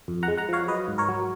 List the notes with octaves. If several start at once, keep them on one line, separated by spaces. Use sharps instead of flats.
F2
F#5 A#5
G#3
F#5 A#5
F3 C#5 F5
F#3 B4 D#5
G#2
A#4 C#5
F#3